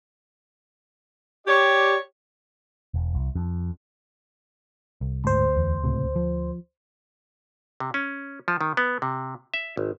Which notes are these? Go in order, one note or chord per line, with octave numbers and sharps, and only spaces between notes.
G4 C#5 D5
E1
C2
F2
C2
F#1 D2 G#2 C5
E2
C#2 A2 C3
F3
C3
C#4
F3
D#3
B3
C3
E5
G#1